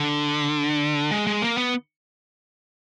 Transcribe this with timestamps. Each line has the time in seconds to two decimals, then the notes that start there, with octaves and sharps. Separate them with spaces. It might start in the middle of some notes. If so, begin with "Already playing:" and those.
Already playing: D3
1.11 G#3
1.27 G#3
1.42 A#3
1.58 B3